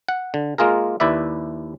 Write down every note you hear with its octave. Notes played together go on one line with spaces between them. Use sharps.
F#5
D3
G#3 A#3 F4 G#4 A#4
D#2 E4 B4 D5 E5